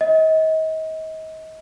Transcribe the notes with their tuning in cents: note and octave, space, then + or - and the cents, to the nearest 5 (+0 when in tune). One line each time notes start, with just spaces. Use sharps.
D#5 +35